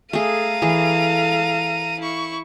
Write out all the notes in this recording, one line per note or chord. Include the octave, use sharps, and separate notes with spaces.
A3 G#4 A4 F5 A#5 D#7
E3 G#4
E4 C#6